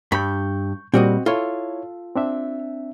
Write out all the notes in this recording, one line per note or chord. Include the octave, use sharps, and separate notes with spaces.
G2 B5 C#6 G6
A#2 G3 C4 F#4 D#5
E4 F4 A4 C#5
C4 D4 E5